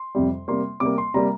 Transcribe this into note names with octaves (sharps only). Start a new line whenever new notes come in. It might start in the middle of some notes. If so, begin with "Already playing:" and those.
Already playing: C6
F2 C3 G3
C3 G3 A#3 C6
C3 G3 A#3 D6
C6
C3 G3 A#3 A#5